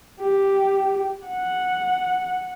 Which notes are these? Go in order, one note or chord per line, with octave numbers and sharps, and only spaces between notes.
G4
F#5